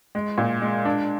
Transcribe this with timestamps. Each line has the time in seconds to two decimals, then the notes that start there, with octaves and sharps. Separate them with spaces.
0.15 G#3
0.38 A#2
0.62 G#3
0.85 D4